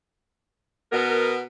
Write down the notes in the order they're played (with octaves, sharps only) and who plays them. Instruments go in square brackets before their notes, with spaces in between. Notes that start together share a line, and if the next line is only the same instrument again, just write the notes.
[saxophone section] B2 B3 A#4